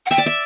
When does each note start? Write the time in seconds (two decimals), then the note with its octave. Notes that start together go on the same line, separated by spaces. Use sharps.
0.06 F#5
0.10 E5 G5
0.18 D5
0.26 E5